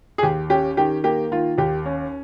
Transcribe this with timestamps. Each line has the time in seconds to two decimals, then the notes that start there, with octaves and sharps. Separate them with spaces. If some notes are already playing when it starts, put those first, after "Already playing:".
0.18 G#4
0.23 D#2 G4
0.50 C#4 G4
0.77 D#3 G4
1.04 A#3 G4
1.31 D#3 F4
1.58 D#2 G4
1.86 C#4